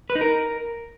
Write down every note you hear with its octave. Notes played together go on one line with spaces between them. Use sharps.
B4
D#4
A#4